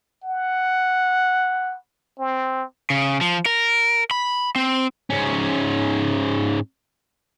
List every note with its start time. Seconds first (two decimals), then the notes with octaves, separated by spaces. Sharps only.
0.23 F#5
2.19 C4
2.90 C#3
3.21 F3
3.46 A#4
4.11 B5
4.56 C4
5.10 G#2 C#4